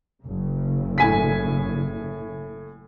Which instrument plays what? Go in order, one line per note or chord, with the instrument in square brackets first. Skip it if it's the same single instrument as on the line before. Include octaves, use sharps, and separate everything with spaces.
[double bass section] F#1 C#3
[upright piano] A2 G#5 B6